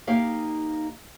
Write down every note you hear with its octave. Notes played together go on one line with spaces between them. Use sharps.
A#3 D#4 G4 F5